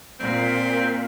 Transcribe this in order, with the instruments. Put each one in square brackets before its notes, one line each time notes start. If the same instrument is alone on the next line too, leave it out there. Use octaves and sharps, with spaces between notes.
[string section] A#2 [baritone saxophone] C4